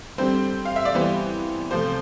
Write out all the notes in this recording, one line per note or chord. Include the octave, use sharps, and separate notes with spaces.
D3 G3 C4 C5
F5
E5
D5
E3 G3 B3 C5
C3 F3 A3 C4 C5